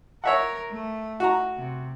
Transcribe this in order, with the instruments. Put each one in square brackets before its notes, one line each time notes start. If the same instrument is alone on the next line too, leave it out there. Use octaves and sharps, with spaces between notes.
[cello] A#4 [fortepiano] C#5 E5 F#5
[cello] A3
[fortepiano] F#4 A#5
[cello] C3